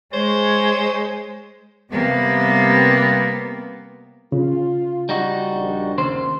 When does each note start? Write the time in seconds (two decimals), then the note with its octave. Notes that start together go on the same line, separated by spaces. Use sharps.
0.13 G#3 C5 C#5
1.93 C3 G3 A#3 B3
4.32 C#3 F4
5.09 G3 D#4 F#4
5.50 A#1
5.98 D#2 C#3 C5